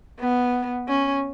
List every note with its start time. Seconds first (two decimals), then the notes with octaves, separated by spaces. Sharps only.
0.19 B3
0.88 C#4